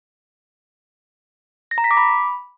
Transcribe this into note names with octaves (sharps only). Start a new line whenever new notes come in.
A#6
A#5
B6
D6
B5